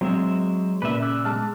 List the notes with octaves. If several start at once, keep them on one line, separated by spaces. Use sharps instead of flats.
F#3 G#3 C4 E5
A#2 C#3 B4 E5
D6 E6 F#6
G#3 A5 F6